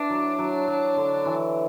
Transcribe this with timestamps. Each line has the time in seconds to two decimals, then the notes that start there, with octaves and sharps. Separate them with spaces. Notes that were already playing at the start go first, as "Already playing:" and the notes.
Already playing: D4 E4 B4
0.10 F#3
0.39 F#3
0.68 F#3
0.97 D3
1.26 E3